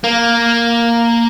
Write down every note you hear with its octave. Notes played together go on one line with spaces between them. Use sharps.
A#3